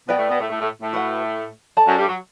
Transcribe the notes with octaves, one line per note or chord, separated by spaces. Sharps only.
B2 B3 B4 D5 G5
A2 A3
B2 B3
A2 A3
A2 A3
A2 A3
A2 A3
F#4 B4 F#5
A4 D5 A5
F#2 F#3
G2 G3
F#3